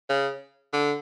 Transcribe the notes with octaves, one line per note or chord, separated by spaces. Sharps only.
C#3
D3